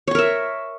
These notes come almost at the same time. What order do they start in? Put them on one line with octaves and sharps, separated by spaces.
C#5 C#6 A#4 E5